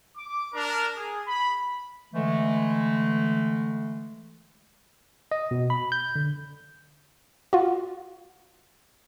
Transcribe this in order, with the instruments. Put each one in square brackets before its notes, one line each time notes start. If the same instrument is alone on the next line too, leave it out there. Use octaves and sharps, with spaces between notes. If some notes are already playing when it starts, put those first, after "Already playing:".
[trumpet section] D6
D4 A#4
G#4
B5
[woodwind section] D3 E3 G#3 A3
[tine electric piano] D#5
B2
B5
G6
D3
[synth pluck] F4 F#4